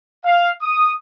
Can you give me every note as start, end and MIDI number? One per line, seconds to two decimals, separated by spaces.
0.25 0.50 77
0.62 0.92 87